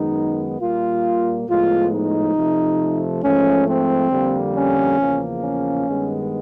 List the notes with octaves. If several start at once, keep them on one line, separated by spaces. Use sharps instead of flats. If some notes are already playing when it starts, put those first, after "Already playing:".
Already playing: F#2 D#3 G#3 B3 D#4
A#2 G3 A#3 F4
A2 F3 G#3 B3 F4
D#4
C3 F3 A3
G#2 F3 A3 C#4
C4
F2 D3 G3 A#3
C#4
E2 C#3 F3 A#3
C#4
G2 D#3 G#3 B3